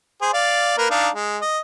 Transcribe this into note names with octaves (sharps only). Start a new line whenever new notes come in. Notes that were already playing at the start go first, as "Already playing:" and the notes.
G#4 C5
D5 F5
A#3 A#4 B4
D4 D#4 F5
G#3
D#5